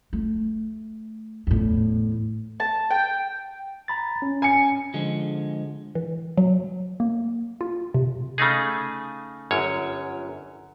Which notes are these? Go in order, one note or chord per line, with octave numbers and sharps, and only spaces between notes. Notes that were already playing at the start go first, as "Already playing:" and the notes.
A3
E2 A2
A5
G5
A#5 B5 A6
C#4
G#5 C#7
D3 F3 G#3
E3
F#3
A#3
F4
C3
C#3 A3 D#4 G#4
G1 F#2 C#5